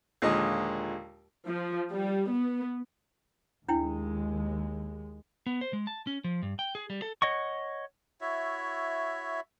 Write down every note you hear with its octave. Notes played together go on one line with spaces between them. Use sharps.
D#2 A#2 D3 F3 G#3 D#5
F3
G3
B3
D#2 G#3 D4 E4 G5
B3
C5
G#3
A5
C#4
F3
G2
G5
G#4
G3
A4
C#5 D#5 F#5 C#6
E4 F#4 C#5 E5